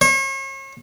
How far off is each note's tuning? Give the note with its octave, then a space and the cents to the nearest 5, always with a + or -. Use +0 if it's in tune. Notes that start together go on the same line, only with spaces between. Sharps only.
C#5 -40